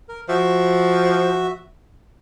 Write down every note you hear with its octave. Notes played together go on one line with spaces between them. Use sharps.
A#4
F3 F#4 E5